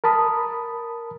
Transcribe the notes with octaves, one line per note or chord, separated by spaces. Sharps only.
A#4 A5 B5 D#6